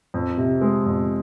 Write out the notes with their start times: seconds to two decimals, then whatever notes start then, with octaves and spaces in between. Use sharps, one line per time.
0.14 F2
0.38 C3
0.61 G#3
0.86 F2